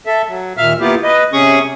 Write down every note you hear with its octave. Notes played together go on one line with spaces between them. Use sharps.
A4 E5
F#3
D#2 A#2 E5 F5 F6
A#3 B3 E4 F4 G4
B4 D#5
C3 C#4 G#4 C#6 D#6